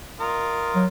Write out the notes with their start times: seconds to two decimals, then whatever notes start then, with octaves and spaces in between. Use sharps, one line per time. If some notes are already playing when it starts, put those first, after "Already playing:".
0.20 F4 A#4 D#5
0.75 F#3